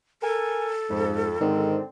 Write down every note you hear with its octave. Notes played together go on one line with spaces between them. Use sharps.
A4 A#4 G#5
F2 G#2
G#2 D3 D#3 C4